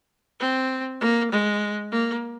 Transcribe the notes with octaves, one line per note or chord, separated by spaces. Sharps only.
C4
A#3
G#3
A#3